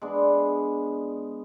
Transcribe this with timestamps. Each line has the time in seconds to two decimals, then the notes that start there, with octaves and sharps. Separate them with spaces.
0.02 G#3 B3 D4